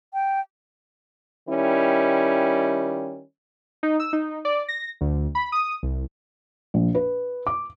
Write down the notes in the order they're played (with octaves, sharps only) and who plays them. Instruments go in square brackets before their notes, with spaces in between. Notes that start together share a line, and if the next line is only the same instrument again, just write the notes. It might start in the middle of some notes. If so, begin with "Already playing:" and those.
[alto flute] G5
[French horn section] D#3 G3 C#4 E4
[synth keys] D#4
E6
D#4
D5
A#6
D2
B5
D#6
C2
[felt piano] A#1
B4
D6